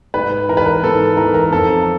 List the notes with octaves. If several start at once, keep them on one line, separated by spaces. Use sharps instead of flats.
G#2 B4
E3 A#4
B4
A#4
G#2 A4
E3 A#4
A#4
F2 A4